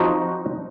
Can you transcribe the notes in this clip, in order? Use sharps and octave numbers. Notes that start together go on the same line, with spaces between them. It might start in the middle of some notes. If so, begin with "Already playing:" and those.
Already playing: F3 C4 D#4 F#4